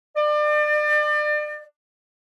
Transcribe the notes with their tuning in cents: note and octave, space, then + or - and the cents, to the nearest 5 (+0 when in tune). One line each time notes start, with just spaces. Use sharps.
D5 +35